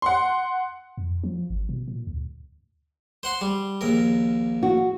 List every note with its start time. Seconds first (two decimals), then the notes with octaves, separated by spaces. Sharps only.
0.02 F#5 C6
0.97 F2
1.23 F3
1.50 G1
1.69 B2
1.88 A#2
2.07 D2
3.23 C5 F#5 C6
3.41 G3
3.81 A#1 D#2 A#4
4.63 F#4